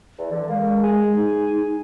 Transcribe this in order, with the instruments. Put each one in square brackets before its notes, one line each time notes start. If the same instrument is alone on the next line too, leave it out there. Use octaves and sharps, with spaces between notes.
[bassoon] E2
[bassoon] D3 [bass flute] E3
[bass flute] G#3 [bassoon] A#3
[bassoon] G#4
[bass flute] D#4